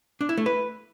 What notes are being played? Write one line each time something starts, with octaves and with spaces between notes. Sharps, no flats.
D4
E4
A3
B4